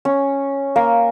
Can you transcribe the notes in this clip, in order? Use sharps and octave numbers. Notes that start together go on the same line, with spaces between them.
C#4
A#3